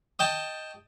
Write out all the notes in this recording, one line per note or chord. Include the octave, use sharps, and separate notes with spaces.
D#5 G5 A5